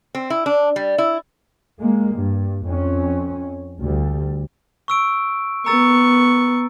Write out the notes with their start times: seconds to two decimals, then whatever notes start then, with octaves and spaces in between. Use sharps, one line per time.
0.15 C4
0.30 E4
0.46 D4
0.76 G3
0.98 E4
1.79 G#3 A#3
2.14 G2
2.65 F2 C#4
3.79 D2 G3
4.88 C#6 E6 D7
5.66 B3 A#5 C#6 E6 A6